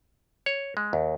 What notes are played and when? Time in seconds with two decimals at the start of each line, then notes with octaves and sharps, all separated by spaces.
0.46 C#5
0.77 G#3
0.93 D#2